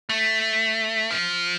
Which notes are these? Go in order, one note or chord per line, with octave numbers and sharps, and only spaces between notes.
A3
F3